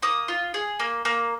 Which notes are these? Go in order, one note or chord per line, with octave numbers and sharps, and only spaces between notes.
A#3 D#6
F4
G#4
A#3
A#3